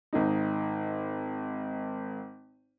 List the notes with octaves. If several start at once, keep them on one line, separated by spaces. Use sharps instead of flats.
G#1 D#4